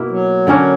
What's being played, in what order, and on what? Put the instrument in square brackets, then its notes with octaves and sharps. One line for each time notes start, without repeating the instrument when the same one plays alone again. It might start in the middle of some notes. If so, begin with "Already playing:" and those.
Already playing: [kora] B2 A#3 E4
[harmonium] F#3
[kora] D3 A#3 C#4 F#4